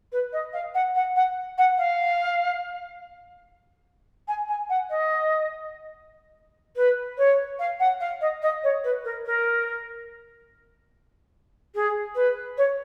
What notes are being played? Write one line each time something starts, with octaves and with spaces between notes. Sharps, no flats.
B4
D#5
F5
F#5
F#5
F#5
F#5
F5
G#5
G#5
F#5
D#5
B4
C#5
F5
F#5
F5
D#5
D#5
C#5
B4
A#4
A#4
G#4
B4
C#5